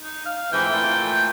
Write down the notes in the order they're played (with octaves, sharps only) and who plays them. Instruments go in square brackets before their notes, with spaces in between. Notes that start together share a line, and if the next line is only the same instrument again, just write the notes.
[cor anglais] D#4
F5
[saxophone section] F2 G#2 E3 [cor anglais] G5
[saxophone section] A#2 E3 A3